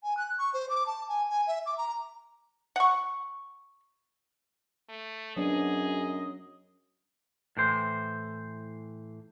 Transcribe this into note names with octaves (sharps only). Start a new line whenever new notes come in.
G#5
F#6
C#6
C5
D6
A5
G#5
G#5
E5
D6
A#5
F#5 C#6
A3
F#2 F#3 B3 D4 G#4 D#5
A2 E3 C5